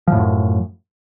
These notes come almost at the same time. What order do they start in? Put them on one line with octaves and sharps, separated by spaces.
F3 A2 F#2